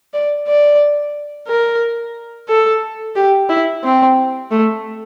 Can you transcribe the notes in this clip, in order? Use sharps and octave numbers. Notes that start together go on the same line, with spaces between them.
D5
D5
A#4
A4
G4
E4
C4
A3